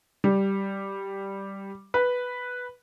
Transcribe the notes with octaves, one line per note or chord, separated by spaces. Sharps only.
G3
B4